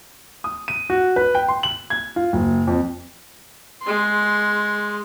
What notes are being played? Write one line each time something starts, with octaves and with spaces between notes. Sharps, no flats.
D#6
D#7
F#4
B4
G5
C6
F#7
G#6
F4
F#1
F2
G#3 C6